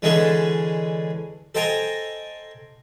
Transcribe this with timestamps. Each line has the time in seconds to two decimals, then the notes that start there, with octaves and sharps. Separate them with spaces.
0.02 D3 E3 G#3 C#4 G#4 A4
1.55 A4 C5 D#5 G5 G#5 A#5